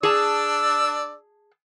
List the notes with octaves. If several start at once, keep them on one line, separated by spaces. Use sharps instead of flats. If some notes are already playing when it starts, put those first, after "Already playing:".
D4 G#4 D5 A5 E6